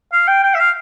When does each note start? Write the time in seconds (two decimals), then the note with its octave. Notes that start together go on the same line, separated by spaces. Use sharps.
0.12 F5
0.28 G5
0.43 G5
0.54 E5
0.59 F5